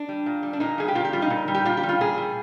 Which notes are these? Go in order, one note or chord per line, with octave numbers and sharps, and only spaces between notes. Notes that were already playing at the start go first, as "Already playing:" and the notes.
Already playing: D4
G3
A#2
G3
D4
A#2 D#4
G3 G#4
G4
A#2 F4
G4
G3 F4
D#4
A#2
G3
G4
A#2 F4
G4
G3
F4
A#2 G#4
G3